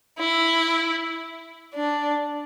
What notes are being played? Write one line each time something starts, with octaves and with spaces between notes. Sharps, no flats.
E4
D4